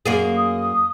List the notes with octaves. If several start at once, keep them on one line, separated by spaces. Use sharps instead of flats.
F#2 A#3 G#4
D#6